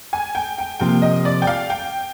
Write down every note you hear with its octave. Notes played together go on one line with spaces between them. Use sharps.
G#5
G5
G5
C3 F3 A#3 G5
D#5
D5
G5
F5
G5